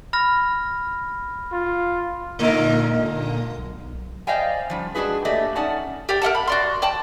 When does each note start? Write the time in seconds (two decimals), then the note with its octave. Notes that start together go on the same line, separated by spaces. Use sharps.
0.13 B5 F6 A#6
1.52 F4
2.39 A#2 D3 G#3 A#3 D#4 A#4
3.57 B1
4.27 C5 D5 D#5 F5 G5 G#5
4.70 F3 G3 C#4
4.95 G#3 D4 F#4 G#4 B4
5.25 A3 A#3 G4 D5 D#5
5.55 C#4 D#4 D5 F#5 A5
6.09 G4 D5 G5
6.22 A#4 D#5 F#5 A5
6.35 B5
6.48 F#4 D5 C6
6.82 D5 G5 A5